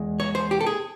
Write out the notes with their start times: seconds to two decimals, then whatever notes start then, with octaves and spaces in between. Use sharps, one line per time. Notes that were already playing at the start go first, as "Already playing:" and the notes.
Already playing: E2 G#3
0.20 C#5
0.35 C5
0.51 G4
0.61 A4
0.66 G#4